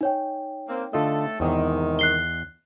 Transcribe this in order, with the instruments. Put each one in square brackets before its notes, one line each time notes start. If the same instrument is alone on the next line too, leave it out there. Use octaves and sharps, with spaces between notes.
[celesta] D#4 C#5 G5
[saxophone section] A#3 C4
[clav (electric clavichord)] D3 F4 D#5 [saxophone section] A3 A4
[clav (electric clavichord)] E2 D#5 A#5 [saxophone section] G#2 C3 D#3
[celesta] F#6 C7 G7